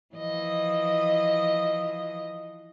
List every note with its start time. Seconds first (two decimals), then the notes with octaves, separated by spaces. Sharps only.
0.15 E3 F3 D#5